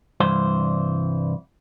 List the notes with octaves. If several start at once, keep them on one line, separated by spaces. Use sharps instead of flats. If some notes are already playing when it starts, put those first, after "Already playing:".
C2 G2 E3 C5